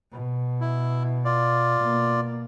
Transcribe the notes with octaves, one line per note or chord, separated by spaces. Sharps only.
B2
E4
F4 D5
B2 A#3